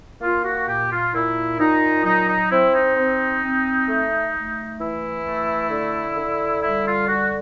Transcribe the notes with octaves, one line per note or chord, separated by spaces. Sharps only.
A#3 F4
F#4
A#2 G4
F4
A#2 E4
A#2 D#4
F#3 D#4
D#4
C4 E4
D#4
C4
C4
A3
A3
E3 E4
A3
D3
D3
G3 E4
F4
D3 F#4